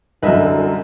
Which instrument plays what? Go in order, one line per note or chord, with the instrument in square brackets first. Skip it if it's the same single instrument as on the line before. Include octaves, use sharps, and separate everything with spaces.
[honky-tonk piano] C2 F#2 [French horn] D3 [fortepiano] B4 D#5 E5